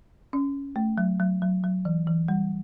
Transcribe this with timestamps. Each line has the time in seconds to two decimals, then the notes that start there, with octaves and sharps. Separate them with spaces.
0.33 C#4
0.76 A3
0.98 F#3
1.20 F#3
1.42 F#3
1.64 F#3
1.85 E3
2.07 E3
2.28 G3